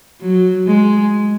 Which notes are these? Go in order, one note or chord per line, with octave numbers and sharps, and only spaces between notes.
F#3
G#3